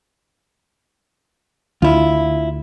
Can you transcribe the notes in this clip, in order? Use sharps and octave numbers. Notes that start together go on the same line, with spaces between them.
D2 E4 F4